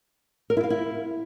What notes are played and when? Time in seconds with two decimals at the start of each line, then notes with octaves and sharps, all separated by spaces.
0.50 A#4
0.57 E4
0.64 F5
0.70 E4